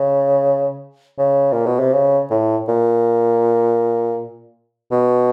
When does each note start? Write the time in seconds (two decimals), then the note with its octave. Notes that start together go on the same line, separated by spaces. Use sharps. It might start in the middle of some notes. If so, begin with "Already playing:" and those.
Already playing: C#3
1.18 C#3
1.52 A#2
1.66 B2
1.79 C3
1.93 C#3
2.30 A2
2.68 A#2
4.92 B2